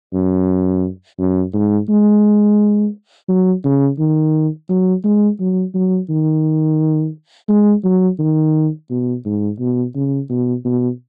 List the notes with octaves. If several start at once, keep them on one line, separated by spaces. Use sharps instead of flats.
F#2
F#2
G#2
G#3
F#3
C#3
D#3
F#3
G#3
F#3
F#3
D#3
G#3
F#3
D#3
B2
G#2
B2
C#3
B2
B2